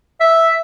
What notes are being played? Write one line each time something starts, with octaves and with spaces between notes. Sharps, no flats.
E5